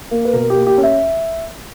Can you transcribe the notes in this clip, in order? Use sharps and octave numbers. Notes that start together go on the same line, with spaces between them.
A#3
B4
B2 A#4
G4
A#3
G4
C#4
E5